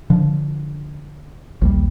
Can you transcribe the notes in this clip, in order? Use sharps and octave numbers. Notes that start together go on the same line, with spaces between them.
D3 F3
A#1 D#2 G3